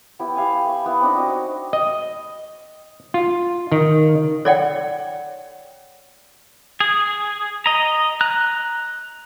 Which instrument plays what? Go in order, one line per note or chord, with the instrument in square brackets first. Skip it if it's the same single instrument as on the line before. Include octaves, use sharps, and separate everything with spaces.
[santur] B3 E4 G4
G4 F5 G#5
E5 B5 C#6
B3 E4
C4 D4 D#4
F#4 D#5 D6
[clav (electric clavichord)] D#5
F4
D#3
[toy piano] C#5 D5 F#5 G5
[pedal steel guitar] G#4
D#5 A#5
A#5 F#6